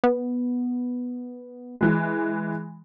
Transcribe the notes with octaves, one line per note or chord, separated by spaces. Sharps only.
B3
E3 G#3